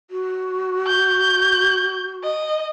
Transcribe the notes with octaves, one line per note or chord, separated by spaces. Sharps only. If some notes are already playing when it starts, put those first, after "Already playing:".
F#4
G6
D#5